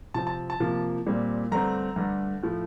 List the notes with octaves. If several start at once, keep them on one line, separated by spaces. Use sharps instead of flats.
C3 F3 C4 A5
A5
A5
C3 F3 A#3
A#2 G3 C4
G2 D3 A3 C4 A#5
G2 D3 A3
A2 F3 A3